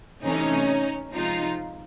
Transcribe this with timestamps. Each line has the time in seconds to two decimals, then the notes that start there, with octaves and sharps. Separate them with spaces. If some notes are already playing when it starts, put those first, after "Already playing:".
0.24 C3 E3 A3 C#4 D#4
1.13 C3 F3 G#3 D#4 F4